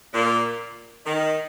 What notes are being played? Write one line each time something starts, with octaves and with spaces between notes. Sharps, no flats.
A#2
D#3